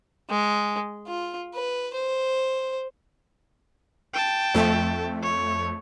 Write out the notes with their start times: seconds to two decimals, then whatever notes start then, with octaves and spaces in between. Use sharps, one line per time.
0.30 G#3
1.08 F4
1.55 B4
1.94 C5
4.14 G5 A5
4.55 F2 A3
5.22 C#5